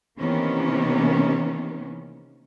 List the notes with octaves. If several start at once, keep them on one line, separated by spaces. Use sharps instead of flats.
C3 D#3 E3 A#3 B3 C#4